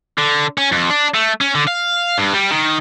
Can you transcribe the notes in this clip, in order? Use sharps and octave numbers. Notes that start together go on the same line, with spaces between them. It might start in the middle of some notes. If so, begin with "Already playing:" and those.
D3
C#4
F2
D4
A3
C#4
D3
F5
G2
G3
D#3